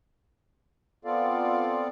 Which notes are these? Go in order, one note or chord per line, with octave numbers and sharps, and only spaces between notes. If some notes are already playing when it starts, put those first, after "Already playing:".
B3 C4 F4 A4 D5 F5